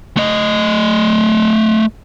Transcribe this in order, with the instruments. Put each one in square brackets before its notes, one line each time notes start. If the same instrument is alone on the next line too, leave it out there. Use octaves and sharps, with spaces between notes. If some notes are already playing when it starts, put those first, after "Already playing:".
[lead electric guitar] A3 D#5